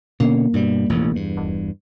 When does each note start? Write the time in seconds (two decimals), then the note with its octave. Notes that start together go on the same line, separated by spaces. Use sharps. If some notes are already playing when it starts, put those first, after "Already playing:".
0.20 B2 D3 A#3 C#4
0.54 G2 B2 G3
0.89 E1 A1 F2
1.12 E2 G2
1.37 D#1